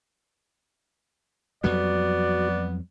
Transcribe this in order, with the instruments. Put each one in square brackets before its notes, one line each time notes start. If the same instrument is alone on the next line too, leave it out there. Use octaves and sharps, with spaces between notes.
[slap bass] F2 F#3 G3 [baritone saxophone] B3 [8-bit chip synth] F#4 [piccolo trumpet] D5